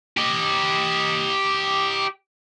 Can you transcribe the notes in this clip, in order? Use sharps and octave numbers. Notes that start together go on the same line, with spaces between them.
G4 D#5